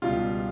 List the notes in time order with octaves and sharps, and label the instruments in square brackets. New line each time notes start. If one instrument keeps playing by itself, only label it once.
[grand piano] C#2 B2 G3 F4